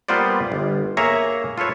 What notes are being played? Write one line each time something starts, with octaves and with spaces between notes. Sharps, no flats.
G3 A#3 B3 F4 C5 D5
G1
A#3 G#4 C#5 E5 A#5
F4 A4 B4 C#5